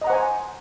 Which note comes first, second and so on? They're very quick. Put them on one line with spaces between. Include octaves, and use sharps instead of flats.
D#5 A#5 F#5 C5 G#5